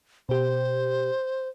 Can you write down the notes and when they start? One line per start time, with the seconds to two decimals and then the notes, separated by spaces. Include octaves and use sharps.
0.29 B2 G4 C5